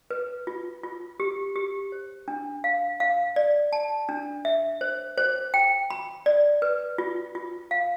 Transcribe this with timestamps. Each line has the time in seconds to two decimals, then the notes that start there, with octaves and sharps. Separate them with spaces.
0.11 B4
0.47 F4
0.84 F4
1.20 G4
1.56 G4
1.92 C5
2.28 D4
2.64 F5
3.00 F5
3.36 D5
3.72 A5
4.09 D4
4.45 E5
4.81 C5
5.18 C5
5.54 G5
5.90 B5
6.26 D5
6.62 B4
6.98 F4
7.35 F4
7.71 F5